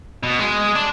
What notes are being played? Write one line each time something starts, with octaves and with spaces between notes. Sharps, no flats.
B2
G#3
D4